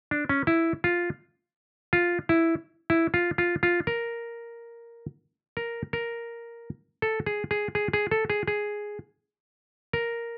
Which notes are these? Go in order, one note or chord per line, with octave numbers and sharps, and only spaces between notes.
D4
C#4
E4
F4
F4
E4
E4
F4
F4
F4
A#4
A#4
A#4
A4
G#4
G#4
G#4
G#4
A4
G#4
G#4
A#4